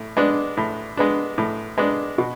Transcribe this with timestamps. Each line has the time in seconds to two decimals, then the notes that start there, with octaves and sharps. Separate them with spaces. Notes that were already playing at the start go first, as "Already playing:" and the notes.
Already playing: A2
0.17 G#3 B3 D4
0.57 A2
0.97 G#3 B3 D4
1.38 A2
1.78 G#3 B3 D4
2.18 B2